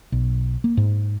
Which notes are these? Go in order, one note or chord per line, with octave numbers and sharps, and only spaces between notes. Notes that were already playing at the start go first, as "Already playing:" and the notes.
B1
A#3
G#2